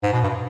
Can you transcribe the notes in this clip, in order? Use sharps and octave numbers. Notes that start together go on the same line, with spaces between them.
G#2
B2
G2